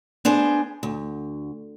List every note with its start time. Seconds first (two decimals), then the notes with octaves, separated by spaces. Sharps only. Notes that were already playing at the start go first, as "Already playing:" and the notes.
0.25 B3 D4 G#4 C5
0.83 D2